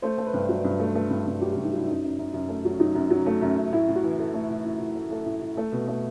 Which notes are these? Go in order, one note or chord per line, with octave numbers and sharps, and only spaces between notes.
A3 C5
A3
B4
G2
F#3
G2
A3
A3
G2
G2
F#3 G4
F#4
G2
D#4
F#3 E4
F#2 D#4
F#2
F#2
F#2
A3
F#3
F#3 D#4
F#2
F#3
A3
F#2
F#2
A2 E4
A2
F#4
E3
E3 A4
A3
A2
A2
A2
A3
A3 A4
A2
A2
A3
B2
A3